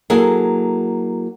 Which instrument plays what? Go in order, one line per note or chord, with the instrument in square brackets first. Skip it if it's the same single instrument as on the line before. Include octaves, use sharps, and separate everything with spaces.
[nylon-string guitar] F#3 A#3 E4 G#4 A4